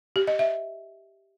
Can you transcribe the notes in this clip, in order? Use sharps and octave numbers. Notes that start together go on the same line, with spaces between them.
G4
D#5
E5